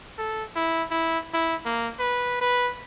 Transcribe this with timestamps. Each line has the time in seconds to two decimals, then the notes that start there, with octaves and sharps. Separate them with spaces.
0.18 A4
0.56 E4
0.91 E4
1.34 E4
1.66 A#3
1.99 B4
2.41 B4